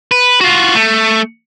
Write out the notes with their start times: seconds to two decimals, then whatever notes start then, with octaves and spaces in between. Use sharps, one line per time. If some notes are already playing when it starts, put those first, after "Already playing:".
0.11 B4
0.41 F4 F#4
0.75 A3